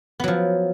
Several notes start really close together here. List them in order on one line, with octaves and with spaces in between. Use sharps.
B3 F#3 F3